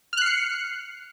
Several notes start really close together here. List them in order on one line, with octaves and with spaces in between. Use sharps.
F6 F#6 C7 C#7